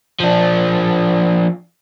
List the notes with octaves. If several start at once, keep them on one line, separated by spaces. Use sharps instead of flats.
F3 D4